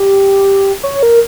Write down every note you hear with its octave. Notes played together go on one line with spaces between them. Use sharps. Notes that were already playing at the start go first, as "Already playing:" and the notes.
Already playing: G4
C#5
A#4